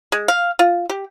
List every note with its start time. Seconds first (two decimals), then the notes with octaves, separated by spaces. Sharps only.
0.12 G#3
0.28 F5
0.59 F4
0.89 G4